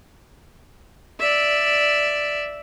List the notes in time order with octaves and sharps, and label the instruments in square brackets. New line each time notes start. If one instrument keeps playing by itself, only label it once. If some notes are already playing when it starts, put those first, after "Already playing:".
[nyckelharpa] D5 E5